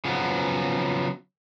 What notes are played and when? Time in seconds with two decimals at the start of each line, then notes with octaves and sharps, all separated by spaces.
0.05 C#3 F3 F#3 B3